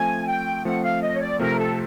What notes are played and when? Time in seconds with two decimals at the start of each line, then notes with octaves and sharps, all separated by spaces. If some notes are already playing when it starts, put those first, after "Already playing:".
Already playing: F3 A3 C4 G#5
0.28 G5
0.65 F3 A3 C4 F#5
0.83 F5
1.02 D#5
1.15 C#5
1.21 D5
1.39 C3 F3 A3 C4 A#4
1.59 A4